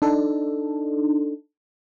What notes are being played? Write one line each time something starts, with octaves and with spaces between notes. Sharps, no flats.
D4 D#4 A4